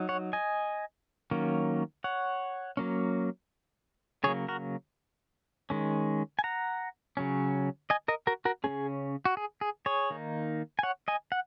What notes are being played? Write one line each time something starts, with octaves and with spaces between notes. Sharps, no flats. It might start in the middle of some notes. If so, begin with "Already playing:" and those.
Already playing: F#3 D#4
C#5 F#5
D#5 G#5
D#3 F#3 A#3 C#4
C#5 F#5
F#3 A#3 C#4
C#3 F#3 A#3 G#4 C#5
F#4 A#4
D#3 G#3 C#4
G#5
F#5 A#5
C#3 F#3 C#4
D#5 G#5
A#4 D#5
F#4 A#4
F#4 A#4
C#3 A#3 C#4 G#4
F#4
G#4
G#4
G#4 C#5
D#3 A#3 D#4
G#5
C#5 F#5
D#5 G#5
F#5